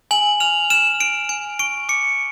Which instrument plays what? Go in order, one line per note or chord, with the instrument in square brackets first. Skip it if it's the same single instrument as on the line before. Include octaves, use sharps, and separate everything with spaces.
[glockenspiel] G#5 F#7
F6 F7
F6 E7
F6 D7
G#5 D7
C#6 D7
D6 C#7